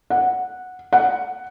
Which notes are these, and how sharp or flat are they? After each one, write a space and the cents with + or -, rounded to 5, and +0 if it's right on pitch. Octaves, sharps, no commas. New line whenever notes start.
F#5 -10
F#5 +5